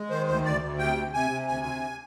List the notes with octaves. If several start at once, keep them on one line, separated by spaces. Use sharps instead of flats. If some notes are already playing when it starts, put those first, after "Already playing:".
Already playing: G#3
D#3 C5
D2 C5
D2 D5
D2
C3 G5
C3
C3 G#5
C3
D2 G#5
C3